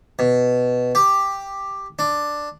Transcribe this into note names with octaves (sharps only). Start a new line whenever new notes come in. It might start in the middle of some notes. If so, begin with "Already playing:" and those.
B2
G4
D4